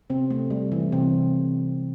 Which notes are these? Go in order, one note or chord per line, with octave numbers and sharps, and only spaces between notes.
C3 C4
A3
G3
E3
C3 C4